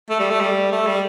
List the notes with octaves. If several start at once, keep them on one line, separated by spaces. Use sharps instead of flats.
A3
G3
A3
G3
A3
G3